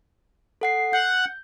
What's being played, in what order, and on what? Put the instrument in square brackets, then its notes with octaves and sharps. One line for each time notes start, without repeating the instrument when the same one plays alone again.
[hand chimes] A4 F#5 C7
[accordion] F#5 [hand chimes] G6